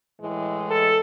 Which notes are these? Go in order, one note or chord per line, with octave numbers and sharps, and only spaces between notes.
A2 E3 G#3
A4